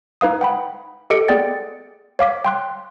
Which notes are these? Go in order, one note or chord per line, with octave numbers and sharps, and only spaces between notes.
D#4 B4 F5 D#6
F#5 G5 B5
G4 A4 D#5 C#7 D7
B3 G#4 D5 G5 A6
C#5 F5 D6 B6
G5 C6 F#6